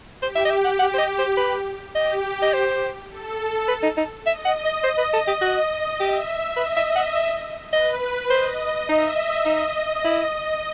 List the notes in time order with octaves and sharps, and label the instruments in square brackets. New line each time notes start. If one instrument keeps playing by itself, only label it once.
[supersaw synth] G4 [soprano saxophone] C5
[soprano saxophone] E5
D#5
E5
F#5
F#5
C5
D#5
C5
B4
[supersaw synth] G4 [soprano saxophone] D#5
[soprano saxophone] D#5
C5
[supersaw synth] A4
[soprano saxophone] B4
D#4
D#4
[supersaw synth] D#5 [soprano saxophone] E5
[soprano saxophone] F#5
D#5
[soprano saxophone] C5 [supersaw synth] D#5
[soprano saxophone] B4
A4
G4
F#4
[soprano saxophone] G4 [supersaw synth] E5
[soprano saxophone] B4 [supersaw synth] D#5
[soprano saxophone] E5
F#5
E5
[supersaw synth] B4 [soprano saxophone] D#5
[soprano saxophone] C5 [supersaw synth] D#5
[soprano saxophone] D#4 [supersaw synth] E5
[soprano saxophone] D#4 [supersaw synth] D#5
[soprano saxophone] E4 [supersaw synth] D#5
[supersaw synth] D#5